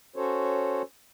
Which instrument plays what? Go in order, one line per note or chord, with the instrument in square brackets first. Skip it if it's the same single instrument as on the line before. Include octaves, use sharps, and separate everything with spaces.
[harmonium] C#4 F#4 A4 C5 C#5